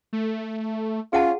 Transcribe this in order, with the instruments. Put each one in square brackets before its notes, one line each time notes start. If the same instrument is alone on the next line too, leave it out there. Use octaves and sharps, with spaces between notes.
[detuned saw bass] A3
[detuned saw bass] C#4 [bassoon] F4 [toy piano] G#4 F#5 A5